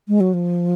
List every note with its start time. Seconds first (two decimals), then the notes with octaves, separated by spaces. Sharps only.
0.08 G#3
0.20 F#3
0.34 F3